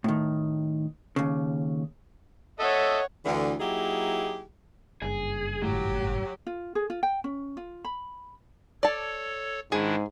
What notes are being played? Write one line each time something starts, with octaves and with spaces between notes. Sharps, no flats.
A2 D#3
D#2 C#3
A4 C#5 D#5 E5 F#5
D2 D3 E3
F#3 A#3 D#4 E4 G4 G#4
F#1 G2 G#4
G#1 A2 F#3 G4
F4
G#4
F4
G5
C#4
F4
B5
A4 C#5 D5 A5
G#2 D#3 D4 E4 G#4